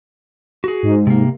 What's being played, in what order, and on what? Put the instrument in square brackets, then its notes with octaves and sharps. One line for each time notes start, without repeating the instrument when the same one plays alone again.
[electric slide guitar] F#4 G#4
[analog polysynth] G#2
[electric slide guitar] C3 A#3